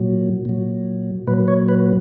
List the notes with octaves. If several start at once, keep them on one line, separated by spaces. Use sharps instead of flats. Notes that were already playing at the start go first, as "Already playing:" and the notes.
Already playing: A#2 F#3
A#2 F#3
A#2 F#3 B4
C#5
B4